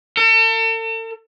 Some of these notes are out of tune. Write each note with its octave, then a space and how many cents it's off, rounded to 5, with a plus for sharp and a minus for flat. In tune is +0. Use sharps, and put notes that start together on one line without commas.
A4 +40